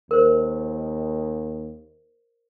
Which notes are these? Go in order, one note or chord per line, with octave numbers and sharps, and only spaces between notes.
D#2 A#4 C5